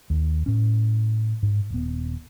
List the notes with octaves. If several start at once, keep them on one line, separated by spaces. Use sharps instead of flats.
D#2
A2 C#4
G#2
D#1 B3